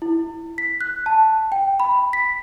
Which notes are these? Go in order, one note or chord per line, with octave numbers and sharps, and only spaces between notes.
E4
B6
F#6
A5
G5
B5
B6